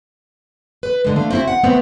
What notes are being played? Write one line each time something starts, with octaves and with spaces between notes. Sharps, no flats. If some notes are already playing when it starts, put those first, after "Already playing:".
B4
D3 G#3
A3 D4 F5
C4 E4 F#4
F#5
A3 B3 C4